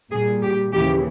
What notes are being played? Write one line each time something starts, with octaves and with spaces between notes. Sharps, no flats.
A#2 G3 G#4
G4
D#2 C#3 E3 G4